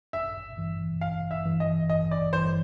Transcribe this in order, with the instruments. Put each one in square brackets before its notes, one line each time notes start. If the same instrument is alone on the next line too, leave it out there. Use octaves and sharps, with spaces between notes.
[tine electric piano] G#1 [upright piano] E5
[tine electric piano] G2 E3
[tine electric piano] G#1 [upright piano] F5
[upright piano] E5
[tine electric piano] G2 E3
[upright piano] D#5
[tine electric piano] G#1 [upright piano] D#5
[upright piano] D5
[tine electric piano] G2 E3 [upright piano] C5